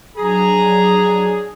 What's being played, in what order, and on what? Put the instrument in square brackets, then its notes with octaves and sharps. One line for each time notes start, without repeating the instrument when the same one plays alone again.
[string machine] F#3 D4 [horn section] G#4 [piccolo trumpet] A#5